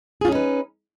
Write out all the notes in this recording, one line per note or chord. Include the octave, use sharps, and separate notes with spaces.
C#4 D#4 F4 G#4 B4